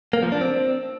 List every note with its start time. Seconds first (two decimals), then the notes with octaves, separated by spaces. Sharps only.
0.13 A#3
0.23 F3
0.32 D4
0.41 C4